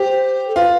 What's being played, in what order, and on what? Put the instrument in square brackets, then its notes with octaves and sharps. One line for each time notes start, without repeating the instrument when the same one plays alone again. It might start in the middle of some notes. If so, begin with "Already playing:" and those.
Already playing: [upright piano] G4 [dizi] C5
[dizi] A4
[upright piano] F4 [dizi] B4